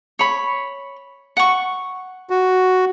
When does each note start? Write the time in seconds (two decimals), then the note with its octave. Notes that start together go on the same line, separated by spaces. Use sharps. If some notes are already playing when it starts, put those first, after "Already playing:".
0.19 C#5 B5
1.37 F#5 C#6
2.30 F#4